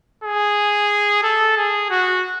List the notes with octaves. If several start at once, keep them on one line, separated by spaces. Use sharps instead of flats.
G#4
A4
G#4
F#4